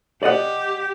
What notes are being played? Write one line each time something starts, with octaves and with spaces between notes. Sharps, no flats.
G4 D5 D#5 F#5